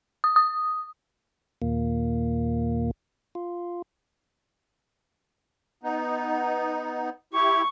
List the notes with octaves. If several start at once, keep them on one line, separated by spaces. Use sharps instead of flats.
D#6
D#6
D#2 A#2 A#3
F4
B3 D#4
E4 G4 C#6